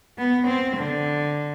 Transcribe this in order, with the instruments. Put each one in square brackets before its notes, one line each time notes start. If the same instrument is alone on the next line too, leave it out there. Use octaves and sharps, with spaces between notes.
[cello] B3
C4
D3